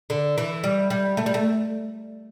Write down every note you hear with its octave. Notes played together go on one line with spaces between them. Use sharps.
D3
E3
G3
G3
A3
G3
A3